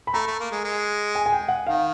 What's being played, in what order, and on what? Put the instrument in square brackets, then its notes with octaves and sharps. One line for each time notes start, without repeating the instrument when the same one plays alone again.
[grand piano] B5
[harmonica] A3 [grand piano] A#5
[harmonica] A3
A#3
G#3
G#3
[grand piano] G#5
G#5
G5
F#5
[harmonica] D#3 [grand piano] F5